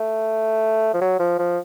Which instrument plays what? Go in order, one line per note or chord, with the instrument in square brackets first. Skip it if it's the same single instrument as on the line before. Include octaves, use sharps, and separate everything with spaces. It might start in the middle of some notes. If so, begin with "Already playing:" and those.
Already playing: [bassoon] A3
F3
F#3
F3
F3